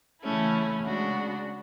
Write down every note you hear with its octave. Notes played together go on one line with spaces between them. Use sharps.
C#3 E3 A3 C#4 E4
C#3 G#3 D4 F#4